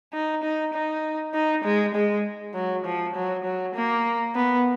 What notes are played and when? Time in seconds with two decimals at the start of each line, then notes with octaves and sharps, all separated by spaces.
0.13 D#4
0.43 D#4
0.74 D#4
1.34 D#4
1.64 G#3
1.95 G#3
2.54 F#3
2.85 F3
3.15 F#3
3.44 F#3
3.75 A#3
4.35 B3